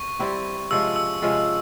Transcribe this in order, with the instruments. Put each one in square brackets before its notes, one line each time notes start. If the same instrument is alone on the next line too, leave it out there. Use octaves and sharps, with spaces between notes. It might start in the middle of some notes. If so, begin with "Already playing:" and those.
Already playing: [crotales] C#6
[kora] G3 C4 E4 G4
[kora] C3 F3 G#3 C#4 [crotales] E6
[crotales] E6
[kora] C3 F3 G#3 C#4